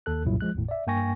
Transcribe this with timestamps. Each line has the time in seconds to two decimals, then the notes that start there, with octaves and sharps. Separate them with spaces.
0.06 D#2 A4 F#6
0.25 C2 F#2 A#2 F#3 E4
0.41 F3 G#3 F#6
0.55 G#1 E2 A2
0.69 D5 E5
0.87 G2 A#3 G5 G#5 C#6 A#6